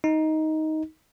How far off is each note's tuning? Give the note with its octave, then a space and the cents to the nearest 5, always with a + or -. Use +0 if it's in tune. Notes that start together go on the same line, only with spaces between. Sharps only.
D#4 +10